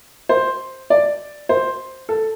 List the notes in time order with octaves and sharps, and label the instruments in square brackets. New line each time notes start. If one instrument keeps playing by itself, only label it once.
[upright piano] C5
D5
C5
A4